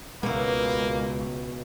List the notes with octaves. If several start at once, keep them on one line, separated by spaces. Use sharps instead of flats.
C#2 B2 G#3 A#3 E4